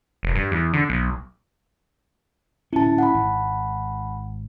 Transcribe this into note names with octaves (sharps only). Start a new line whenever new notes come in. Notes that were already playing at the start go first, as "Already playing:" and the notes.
F1
G2
E2
D3
B1
D1 C#4 E4 A5
F#5 A5 B5
G#1